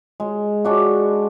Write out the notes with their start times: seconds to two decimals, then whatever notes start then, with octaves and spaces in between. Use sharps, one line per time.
0.20 G#3
0.65 G#3 D4 F#4